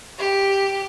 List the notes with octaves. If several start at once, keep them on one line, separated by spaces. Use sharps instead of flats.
G4